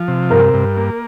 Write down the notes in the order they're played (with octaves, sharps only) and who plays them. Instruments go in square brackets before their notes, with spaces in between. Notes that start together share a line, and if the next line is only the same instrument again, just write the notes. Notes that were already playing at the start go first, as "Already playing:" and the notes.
Already playing: [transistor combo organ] F3
C3
[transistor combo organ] G2 [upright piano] A#4
[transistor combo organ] G2
A#3